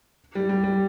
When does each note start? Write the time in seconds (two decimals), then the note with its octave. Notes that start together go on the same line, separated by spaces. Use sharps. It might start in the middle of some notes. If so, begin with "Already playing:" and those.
0.35 G3
0.49 G3
0.64 G3